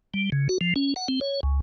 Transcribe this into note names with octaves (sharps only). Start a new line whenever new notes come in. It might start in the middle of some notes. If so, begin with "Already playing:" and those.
G3
C#3
F#4
F3
C#4
F#5
C4
C#5
C#2